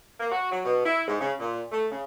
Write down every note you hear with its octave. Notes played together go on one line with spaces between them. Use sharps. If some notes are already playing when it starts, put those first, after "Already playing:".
A#3
F#4
F#3
B2
E4
G#2
C#3
A#2
A3
C#3